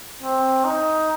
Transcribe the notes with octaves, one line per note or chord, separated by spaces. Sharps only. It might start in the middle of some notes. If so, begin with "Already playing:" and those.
C4
D#4